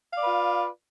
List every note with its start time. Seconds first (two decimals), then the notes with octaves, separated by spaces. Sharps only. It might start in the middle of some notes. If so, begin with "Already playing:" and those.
0.13 F5
0.17 D5
0.22 B4
0.26 F4